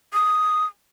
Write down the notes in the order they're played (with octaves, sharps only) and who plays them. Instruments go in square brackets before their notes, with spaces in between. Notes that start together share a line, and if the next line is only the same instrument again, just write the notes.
[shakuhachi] D#6